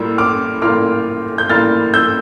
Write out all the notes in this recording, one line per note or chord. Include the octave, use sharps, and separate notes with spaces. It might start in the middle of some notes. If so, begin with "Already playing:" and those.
Already playing: A2 G3 A#3 F4 E6
D6 F6
A2 G3 A#3 F4 D6 F6
G6
A2 G3 A#3 F4 F6 A6
E6 G6